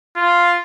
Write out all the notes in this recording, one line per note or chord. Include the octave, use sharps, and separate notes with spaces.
F4